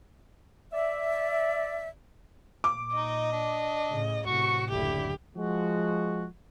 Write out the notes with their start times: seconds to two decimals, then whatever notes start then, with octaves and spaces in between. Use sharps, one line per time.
0.73 D5 E5
2.64 A#2 D6
2.94 D#4 D#5
3.32 D4
3.89 A2 C#3
4.26 A1 A2 C3 F#4 C#6
4.70 F#1 D2 D3 E4 G4
5.36 F3 G#3 F#4